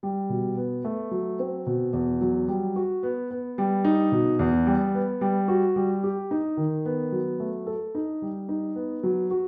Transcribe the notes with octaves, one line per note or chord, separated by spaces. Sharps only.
G3
B2
B3
A3
F#3
C4
B2
E2
F#3
G3
F#4
B3
B3
G3
D#4
B2
E2
G3
B3
G3
F#4
G3
G4
D#4
D#3
B3
F#3
A3
A4
D#4
G3
D#4
B3
F#3
F#4